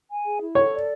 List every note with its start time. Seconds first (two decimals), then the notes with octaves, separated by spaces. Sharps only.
0.09 G#5
0.24 G#4
0.40 E4
0.55 A4 C#5
0.72 D5